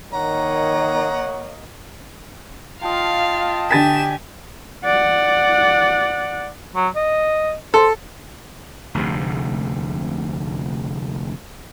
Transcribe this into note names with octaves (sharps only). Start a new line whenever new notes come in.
D#3 A#3 C#5 D#5 F#5 A#5
F4 D#5 F5 G5 A5
D3 G4 G#5 A6 B6 E7
D5 F#5
F#3
D#5
A4 C5
F1 D2 G#2 C3